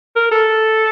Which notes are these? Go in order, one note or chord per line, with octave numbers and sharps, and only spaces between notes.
A#4
A4